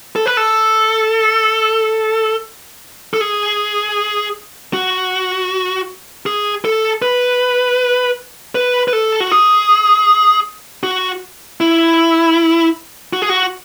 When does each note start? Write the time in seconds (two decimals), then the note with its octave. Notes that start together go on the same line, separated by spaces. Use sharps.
0.16 A4
0.26 B4
0.37 A4
3.14 A4
3.21 G#4
4.73 F#4
6.26 G#4
6.65 A4
7.02 B4
8.55 B4
8.88 B4
8.93 A4
9.20 F#4
9.32 G#4
10.83 F#4
11.61 E4
13.13 F#4
13.22 G#4
13.29 F#4